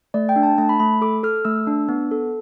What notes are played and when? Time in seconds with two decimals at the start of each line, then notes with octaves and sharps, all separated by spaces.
0.14 A3 D5
0.29 G5
0.36 D4
0.43 A5
0.58 A3 A5
0.69 B5
0.80 A3 B5
1.01 A4 D6
1.23 A4 F6
1.45 A3 E6
1.67 D4
1.89 B3
2.11 A4